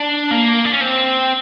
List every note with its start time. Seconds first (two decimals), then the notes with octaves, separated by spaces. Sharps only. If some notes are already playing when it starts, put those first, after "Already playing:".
Already playing: D4
0.31 A#3
0.65 D4
0.73 C#4
0.81 C4